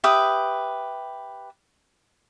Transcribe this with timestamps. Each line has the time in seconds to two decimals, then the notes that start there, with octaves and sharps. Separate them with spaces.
0.04 G4 B4 E5 D#6